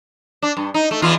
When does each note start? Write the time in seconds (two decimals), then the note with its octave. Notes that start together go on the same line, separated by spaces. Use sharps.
0.42 D4
0.57 G2
0.74 D#4
0.91 A3
1.02 E2 E3 F4